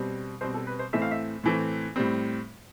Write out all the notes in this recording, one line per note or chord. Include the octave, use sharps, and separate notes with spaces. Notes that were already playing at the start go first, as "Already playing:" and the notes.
Already playing: B2 G3 C4
B2 G3 C4 C5
A4
B4
C5
A2 E3 A3 C4 E5
F5
E5
A2 E3 A3 C4
A2 G3 C4